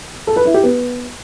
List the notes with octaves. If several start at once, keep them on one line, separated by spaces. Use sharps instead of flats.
A4
B4
E4
G4
B3